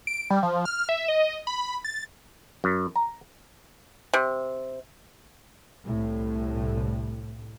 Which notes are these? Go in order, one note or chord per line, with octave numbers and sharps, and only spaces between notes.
D7
G3
F3
F6
E5
D#5
B5
A6
F#2
A#5
C3
C2 A2